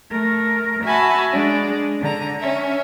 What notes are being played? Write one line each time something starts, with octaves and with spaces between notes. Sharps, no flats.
A3 A#4
F#4 E5 G#5 A5 B5
G#3 D4
D3 A#5
C#4 E5